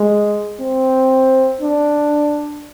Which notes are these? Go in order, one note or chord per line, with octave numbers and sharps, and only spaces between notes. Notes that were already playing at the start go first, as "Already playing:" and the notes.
Already playing: G#3
C4
D4